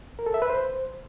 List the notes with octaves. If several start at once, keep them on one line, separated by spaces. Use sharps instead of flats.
A#4
A4
E5
B4
C5